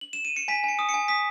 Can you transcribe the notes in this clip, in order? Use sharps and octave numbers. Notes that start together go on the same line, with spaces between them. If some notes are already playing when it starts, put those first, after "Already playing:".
F#7
E7
D#7
C#7
G#5 B6
G#5 C#7
D#6
C#7
G#5
D#6 B6